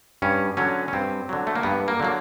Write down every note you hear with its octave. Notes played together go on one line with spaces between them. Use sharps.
G2 C#4
D3 F#3 C#4
C#4
G2 C4
D3 F#3
A3
A#3
G2 B3
A#3
D3 F#3 A#3